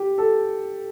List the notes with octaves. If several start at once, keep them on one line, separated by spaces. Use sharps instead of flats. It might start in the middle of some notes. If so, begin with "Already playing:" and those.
Already playing: G4
A4